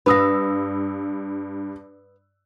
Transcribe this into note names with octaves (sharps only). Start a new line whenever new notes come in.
G2 B4 F5 B5 D#6 E6 A#6